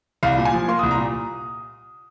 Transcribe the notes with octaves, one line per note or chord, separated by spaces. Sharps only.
C2 F5
A#2
G#5
F3
A#3 C6
C2 D#6
A#5
A#2